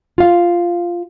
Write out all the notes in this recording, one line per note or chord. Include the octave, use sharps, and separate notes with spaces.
F4 F5